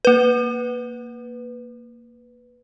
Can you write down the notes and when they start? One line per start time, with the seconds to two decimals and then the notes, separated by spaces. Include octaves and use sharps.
0.05 A#3 B4